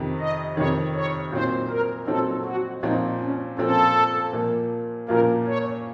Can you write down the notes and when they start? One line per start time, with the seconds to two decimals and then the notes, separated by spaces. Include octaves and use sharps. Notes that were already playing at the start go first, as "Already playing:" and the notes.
Already playing: F2 C3 D#3
0.19 D#5
0.56 F2 C3 D#3 C#5
0.94 C#5
1.32 A#2 F#3 C4 D#4 C5
1.70 A#4
2.07 A#2 F#3 C4 D#4 A4
2.45 F#4
2.83 A#2 F3 C4 D#4
3.21 C#4
3.58 A#2 F3 C4 A4
4.33 A#2 F3 A#3
5.08 A#2 F3 A#3 A#4
5.47 C#5